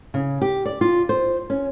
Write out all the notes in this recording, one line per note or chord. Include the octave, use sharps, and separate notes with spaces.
C#3
G4
D5
F4
C5
C#4